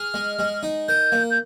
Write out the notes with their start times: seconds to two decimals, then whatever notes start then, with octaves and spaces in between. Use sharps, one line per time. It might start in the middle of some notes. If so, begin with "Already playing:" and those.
Already playing: G#4 F6
0.14 G#3
0.39 G#3
0.63 D#4
0.88 A#4 G6
1.12 A#3
1.30 G6